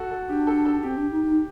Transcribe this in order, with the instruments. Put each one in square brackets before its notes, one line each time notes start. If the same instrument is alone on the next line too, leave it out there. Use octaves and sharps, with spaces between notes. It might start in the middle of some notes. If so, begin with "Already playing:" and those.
Already playing: [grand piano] F#4 A4
A4
[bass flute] D4 [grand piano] G4
[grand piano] A4
A4
[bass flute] C4 [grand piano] G4
[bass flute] D4
D#4
D#4